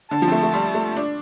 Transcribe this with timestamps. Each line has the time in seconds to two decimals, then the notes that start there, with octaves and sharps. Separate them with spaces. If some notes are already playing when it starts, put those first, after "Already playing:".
0.11 D3 A5
0.22 F3
0.28 C4
0.32 A3
0.43 A3
0.54 G3
0.75 A3
0.96 D4